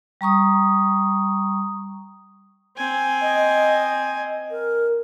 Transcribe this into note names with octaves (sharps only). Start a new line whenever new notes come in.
G3 A#5 C#6 D#6
C4 G#5
D#5
A#4